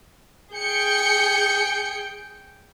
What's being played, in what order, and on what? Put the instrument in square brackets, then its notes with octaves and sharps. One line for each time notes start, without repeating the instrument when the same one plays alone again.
[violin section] G#4 G6 C#7 [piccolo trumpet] G5